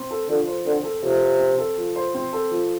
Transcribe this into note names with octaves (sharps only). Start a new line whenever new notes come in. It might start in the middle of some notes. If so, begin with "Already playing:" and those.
Already playing: C4
A4
D3 F3
C5
D3 C4
A4
C3 F3
C5
C4
A4
F3
C5
C4
A4
F3